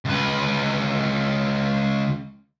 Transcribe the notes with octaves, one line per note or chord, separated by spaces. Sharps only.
C#2 B4